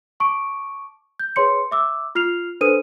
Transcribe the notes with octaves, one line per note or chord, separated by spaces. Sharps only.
A5 C#6 D6 D7
G6
G#4 B4 C#5 C6 C#7
E5 D6 E6
F4 F6 C7 F7
D4 A4 B4 C5 D#6 D#7